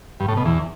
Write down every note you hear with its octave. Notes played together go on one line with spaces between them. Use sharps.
G2
A2
B2
E2